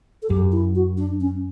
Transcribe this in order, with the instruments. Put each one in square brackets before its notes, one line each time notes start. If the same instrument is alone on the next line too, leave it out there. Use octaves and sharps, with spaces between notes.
[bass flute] A4
[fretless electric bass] F#2 [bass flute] G4
[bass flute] E4
F#4
D4
C#4